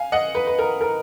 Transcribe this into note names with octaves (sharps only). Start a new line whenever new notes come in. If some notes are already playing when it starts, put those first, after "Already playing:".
Already playing: F5 G#5
D#5 F#5
B4
B4
A#4
A#4